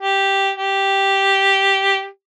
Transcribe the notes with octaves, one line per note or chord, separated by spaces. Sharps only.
G4
G4